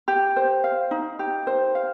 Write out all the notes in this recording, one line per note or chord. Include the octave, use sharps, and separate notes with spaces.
G4
C5
F5
D#4
G4
C5
F5